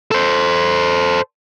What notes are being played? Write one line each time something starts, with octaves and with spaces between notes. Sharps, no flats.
A4 C5